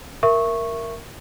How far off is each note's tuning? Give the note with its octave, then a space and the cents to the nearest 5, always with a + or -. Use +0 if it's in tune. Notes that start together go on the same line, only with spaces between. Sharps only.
A#4 +0 E5 +20 C#6 -10